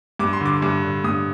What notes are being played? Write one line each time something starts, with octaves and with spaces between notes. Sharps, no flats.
G2 D6
C6
D3 D6
G2 D6
D3
G2 D#6